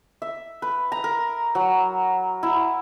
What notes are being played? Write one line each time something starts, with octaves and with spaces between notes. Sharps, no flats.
E5
B4
A#5
A#4
F#3
E4